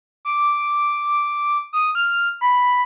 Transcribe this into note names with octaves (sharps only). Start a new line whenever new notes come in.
D6
D#6
F6
B5